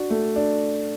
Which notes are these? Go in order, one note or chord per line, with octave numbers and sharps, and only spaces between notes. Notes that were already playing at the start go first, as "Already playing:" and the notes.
Already playing: D4 F#4
A3
D4